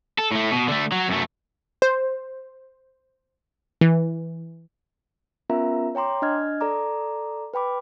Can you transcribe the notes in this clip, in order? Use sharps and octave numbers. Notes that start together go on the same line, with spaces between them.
A4
A2 A3
B2
D3 A3
F#3
F#2 A3
C5
E3
B3 C#4 F4 A#4 E5 A#5
C#5 G5 A#5 C6 D6
D4 D#5 F6 G#6
A4 D5 A#5 D6
B4 G5 B5 D6